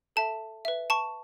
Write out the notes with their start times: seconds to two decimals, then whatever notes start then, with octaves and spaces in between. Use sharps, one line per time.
0.16 A4 E5 A5
0.65 B4 E5
0.90 A5 C#6